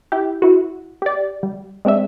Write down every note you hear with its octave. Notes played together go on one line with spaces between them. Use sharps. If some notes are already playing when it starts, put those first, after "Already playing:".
E4 G4
E4 F#4
G4 D5
G3
G#3 C4 D4 E5